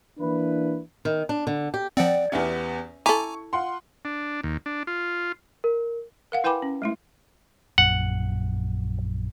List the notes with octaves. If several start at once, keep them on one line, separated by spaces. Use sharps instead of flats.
E3 A#3 D4 E4 B4
D#3
D4
D3
G4
F3 C4 D5 F#5 G5
E2 B3 C#4 G4 E5
E4 A4 G#5 A#5 C#6 D6
F4 F#5 C6
D4
D#2
D4
F4
A#4
A#4 F5 F#5
E4 B4 G5 G#5 B5 D6
C#4
G#3 A3 E4
A#1 F#2 F#5